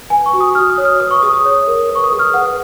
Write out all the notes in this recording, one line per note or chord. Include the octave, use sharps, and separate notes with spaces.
B4 G#5
C#6
F#4
D#6
F#4 F6
D#6
C#5
F6
B4 D#6
C#6
G#4 D#6
D#6
C#5
A#4
B4
C#6
D#6
G#4
F6
B4 F#5